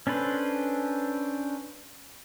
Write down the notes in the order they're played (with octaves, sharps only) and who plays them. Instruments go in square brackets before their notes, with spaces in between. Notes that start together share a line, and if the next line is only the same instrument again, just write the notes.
[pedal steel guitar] C#4 D4 A4 B4 C5